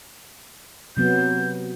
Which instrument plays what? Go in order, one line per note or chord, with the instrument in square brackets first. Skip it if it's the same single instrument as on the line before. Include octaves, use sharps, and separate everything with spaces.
[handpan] C3 F#3 B3 [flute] G6